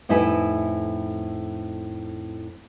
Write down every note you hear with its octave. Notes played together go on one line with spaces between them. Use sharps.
F2 A2 D#4 E4 B4 G#5